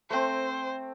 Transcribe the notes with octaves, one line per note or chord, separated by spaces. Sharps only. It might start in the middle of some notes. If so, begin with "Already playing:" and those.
A3 C4 C5